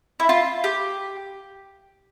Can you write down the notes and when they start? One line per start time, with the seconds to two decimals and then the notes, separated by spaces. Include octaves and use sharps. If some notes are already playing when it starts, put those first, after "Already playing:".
0.20 E4
0.29 F4
0.64 G4